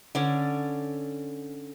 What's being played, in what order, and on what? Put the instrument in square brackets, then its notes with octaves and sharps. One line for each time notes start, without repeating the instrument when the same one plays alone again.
[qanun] D3 C#4 D5